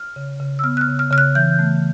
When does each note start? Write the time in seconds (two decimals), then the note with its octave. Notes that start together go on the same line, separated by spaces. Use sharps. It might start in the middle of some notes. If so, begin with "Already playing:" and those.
Already playing: F6
0.16 C#3
0.40 C#3
0.59 E6
0.64 B3 F6
0.77 F#6
0.81 F6
0.88 C#3
0.99 F6
1.11 C#3 F6
1.18 F#6
1.35 E3 G6
1.59 A3